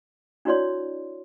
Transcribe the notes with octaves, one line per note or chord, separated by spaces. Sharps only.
D4 E4 F#4 C#5 D5 C6